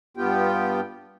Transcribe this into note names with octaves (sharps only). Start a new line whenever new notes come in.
G2 B3 F4 G4 G5